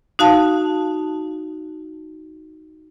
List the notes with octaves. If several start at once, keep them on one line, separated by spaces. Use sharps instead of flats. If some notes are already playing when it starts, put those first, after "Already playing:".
D#4 F#4 F5 A5